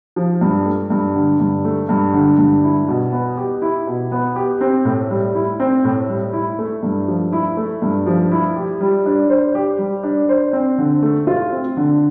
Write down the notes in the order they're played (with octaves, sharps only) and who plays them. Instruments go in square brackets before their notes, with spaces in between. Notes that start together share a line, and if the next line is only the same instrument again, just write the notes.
[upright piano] F3
G2
A3
G2
D3
G2
A3
G2
D3
G2
E4
B2
B3
G4
E4
B2
B3
G4
C4
A2
G3
E4
C4
A2
G3
E4
A3
G2
F3
E4
A3
G2
F3
E4
G4
G3
D4
C5
G4
G3
D4
C5
C4
D3
A3
F4
C4
D3